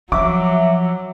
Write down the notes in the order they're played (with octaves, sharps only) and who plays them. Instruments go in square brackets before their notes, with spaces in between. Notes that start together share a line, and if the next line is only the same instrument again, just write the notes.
[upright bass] F3 [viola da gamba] F#3 [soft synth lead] E5 [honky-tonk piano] D6